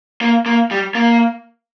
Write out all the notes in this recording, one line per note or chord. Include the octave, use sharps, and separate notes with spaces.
A#3
A#3
G3
A#3